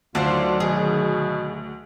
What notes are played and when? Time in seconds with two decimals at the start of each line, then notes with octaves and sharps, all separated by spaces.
0.15 D2 D3 D#3 F#3 D4 F4 C5
0.60 B2 G#4